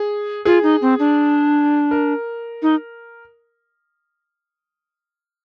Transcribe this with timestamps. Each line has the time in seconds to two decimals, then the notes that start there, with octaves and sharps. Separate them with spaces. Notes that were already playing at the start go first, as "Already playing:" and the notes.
Already playing: G#4
0.45 F4 G#4
0.63 D#4
0.82 C4
0.99 D4
1.91 A#4
2.62 D#4